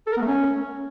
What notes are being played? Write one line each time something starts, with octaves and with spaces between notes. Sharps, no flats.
A4
A#4
B3
A3
C#4